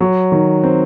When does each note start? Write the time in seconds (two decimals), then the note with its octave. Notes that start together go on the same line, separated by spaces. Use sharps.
0.01 F#3
0.32 D#3
0.64 C4